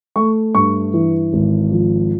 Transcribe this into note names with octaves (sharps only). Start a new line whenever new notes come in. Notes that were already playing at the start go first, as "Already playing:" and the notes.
A3 C#6
G2 C#6
E3
G#1
F3